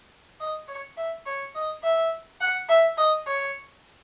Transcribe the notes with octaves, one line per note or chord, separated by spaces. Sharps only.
D#5
C#5
E5
C#5
D#5
E5
F#5
E5
D#5
C#5